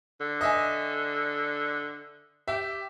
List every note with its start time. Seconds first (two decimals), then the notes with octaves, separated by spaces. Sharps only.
0.20 D3
0.41 D#5 E5 G#5
2.48 G4 E5